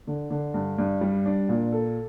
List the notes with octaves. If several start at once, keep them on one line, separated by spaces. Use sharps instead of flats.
D3
D3
G2
G2
G3
D4
A#2
A4